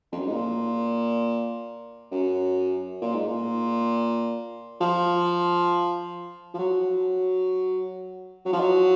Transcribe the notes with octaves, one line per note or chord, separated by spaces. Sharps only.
F2
F#2
G#2
A#2
F#2
A#2
G#2
A#2
F3
F3
F#3
F#3
F3
F#3